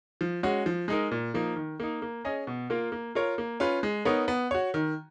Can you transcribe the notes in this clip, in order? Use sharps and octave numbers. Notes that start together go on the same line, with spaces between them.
F3
G#3 C#4 F#4
F3
G#3 D#4 A#4
A#2
F3 A#3 D#4
D#3
A#3 D#4
A#3
C#4 G#4 D#5
B2
A#3 F4 A#4
A#3
F4 A#4 C#5
A#3
C#4 F4 B4
G#3
B3 D#4 A#4 C#5
B3
F#4 C#5
D#3